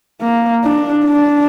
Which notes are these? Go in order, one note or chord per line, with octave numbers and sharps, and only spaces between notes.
A#3
D4
D4